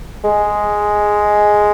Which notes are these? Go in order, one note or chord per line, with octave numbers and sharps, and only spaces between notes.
G#3